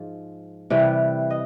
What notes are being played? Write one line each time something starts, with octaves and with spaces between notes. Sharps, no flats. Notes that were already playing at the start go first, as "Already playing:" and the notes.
Already playing: G#2 F3
C3 E3 G3
D#5